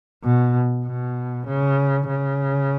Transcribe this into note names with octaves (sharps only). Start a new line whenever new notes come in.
B2
B2
C#3
C#3